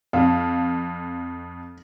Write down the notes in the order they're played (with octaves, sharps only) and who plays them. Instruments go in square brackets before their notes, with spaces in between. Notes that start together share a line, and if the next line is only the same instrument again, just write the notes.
[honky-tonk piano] F2 [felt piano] F5